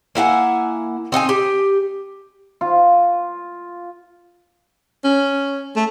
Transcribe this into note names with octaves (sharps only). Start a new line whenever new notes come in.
A#3 E4 F#5 G#5
C4 D#4 F#5 G#5
G4
F4
C#4
A3